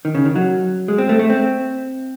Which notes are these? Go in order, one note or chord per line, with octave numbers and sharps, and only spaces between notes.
D#3
C#3
D#3
F#3
G#3
C4
A3
A3
C4